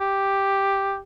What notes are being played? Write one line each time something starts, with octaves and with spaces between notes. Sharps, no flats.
G4